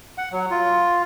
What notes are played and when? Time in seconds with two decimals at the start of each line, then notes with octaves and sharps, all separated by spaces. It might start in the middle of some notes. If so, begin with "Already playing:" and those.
0.18 F#5
0.32 F#3
0.51 F4